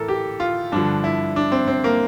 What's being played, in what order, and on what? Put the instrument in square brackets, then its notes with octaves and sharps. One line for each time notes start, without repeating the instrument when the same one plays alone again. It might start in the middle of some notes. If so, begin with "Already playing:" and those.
Already playing: [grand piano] A2 E3 A4 A#4
G4
F4
G2 D3 F3 D4
E4
D4
C4
C4
A#3